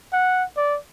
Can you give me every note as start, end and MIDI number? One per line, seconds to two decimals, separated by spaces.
0.13 0.44 78
0.57 0.78 74